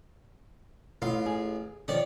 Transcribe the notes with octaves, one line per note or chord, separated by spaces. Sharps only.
A1 F4 F5
G#4
D#3 F3 C#5 D5